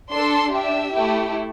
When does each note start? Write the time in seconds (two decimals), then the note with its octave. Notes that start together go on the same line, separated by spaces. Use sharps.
0.11 D4 A4 C6
0.51 D4 G4 E5
0.92 A3 E4 G4